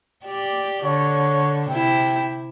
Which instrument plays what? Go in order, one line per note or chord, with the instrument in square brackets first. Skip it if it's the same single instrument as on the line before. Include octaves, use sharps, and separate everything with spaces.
[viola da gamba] G4 D5
[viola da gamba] D3 [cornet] C#5
[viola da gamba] C3 E4 [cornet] G5